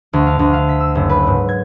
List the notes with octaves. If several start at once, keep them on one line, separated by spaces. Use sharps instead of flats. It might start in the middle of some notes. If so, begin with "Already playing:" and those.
D2
F5
D2
F5
B6
E6
F#1
B4
G#2
G#6